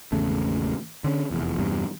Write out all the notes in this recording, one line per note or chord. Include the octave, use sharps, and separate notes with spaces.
G#1 E2 C#3 A3
D3 C#4
F1 E2
E2 G2 C3